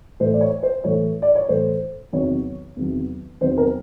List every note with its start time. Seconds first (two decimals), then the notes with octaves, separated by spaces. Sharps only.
0.20 A2 E3 A3 C5
0.33 D5
0.41 C#5
0.63 C5
0.84 A2 E3 A3 C#5
1.22 D5
1.35 C#5
1.48 A2 E3 A3 C5
2.12 E2 C3 D#3 F#3 C#5
2.76 E2 C3 D#3 F#3
3.41 E2 C3 D#3 F#3 C5
3.58 A#4